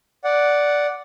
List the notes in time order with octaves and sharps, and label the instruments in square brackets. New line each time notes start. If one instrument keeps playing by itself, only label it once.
[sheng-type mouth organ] D5 F#5